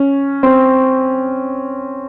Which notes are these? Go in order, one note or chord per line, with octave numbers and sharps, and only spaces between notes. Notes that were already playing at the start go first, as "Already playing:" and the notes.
Already playing: C#4
C4